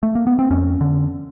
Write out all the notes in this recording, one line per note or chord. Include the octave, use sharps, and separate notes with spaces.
A3
A#3
B3
C4
F2 C#4
D3